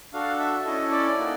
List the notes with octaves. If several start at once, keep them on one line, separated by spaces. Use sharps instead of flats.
D4 F#4 A4 F5
E5
C#4 E4 A4 D#5
D5
A#3 D#4 F#4 A4